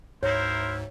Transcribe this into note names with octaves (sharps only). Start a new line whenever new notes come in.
D2 G#2 E4 A#4 C5 C#5